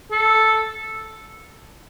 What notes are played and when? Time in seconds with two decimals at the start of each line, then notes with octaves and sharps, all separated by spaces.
0.11 A4